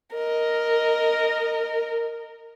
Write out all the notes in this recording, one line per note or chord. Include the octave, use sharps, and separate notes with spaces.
A#4 D#5